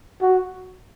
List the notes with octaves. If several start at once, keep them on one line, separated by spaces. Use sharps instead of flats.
F#4